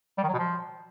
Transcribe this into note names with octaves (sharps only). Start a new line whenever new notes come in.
G3
D#3
F#3
B2
F3